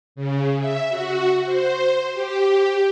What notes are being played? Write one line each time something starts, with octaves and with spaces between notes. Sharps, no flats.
C#3
E5
F#4
C5
G4